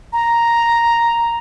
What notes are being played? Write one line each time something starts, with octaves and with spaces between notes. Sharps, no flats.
A#5